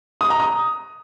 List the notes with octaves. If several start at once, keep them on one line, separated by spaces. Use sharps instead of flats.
D#6
A#5
D#6